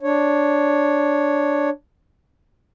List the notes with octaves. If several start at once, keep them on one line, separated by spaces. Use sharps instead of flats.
D4 C#5